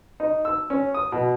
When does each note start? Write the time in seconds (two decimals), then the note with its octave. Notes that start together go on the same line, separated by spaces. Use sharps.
0.20 D#4
0.45 E6
0.70 C#4
0.94 D#6
1.12 B2